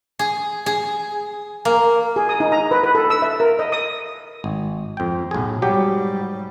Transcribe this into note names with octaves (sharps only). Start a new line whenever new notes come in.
G#4
G#4
A#3
G#4
D#6
D#4
A#5
B4
B4
A4
E6
E5
A#4
D#5
D#6
G#1
F2 G5
B1 A2 G#4
G#2 F#3 G3 G4